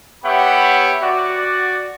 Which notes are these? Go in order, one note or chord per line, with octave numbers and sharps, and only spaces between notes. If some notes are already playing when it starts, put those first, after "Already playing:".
B3 G4 C#5 E5 F#5 B5
F#4 D5